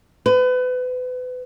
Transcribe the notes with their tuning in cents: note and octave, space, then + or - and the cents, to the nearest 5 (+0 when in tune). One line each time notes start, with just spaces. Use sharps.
B4 +30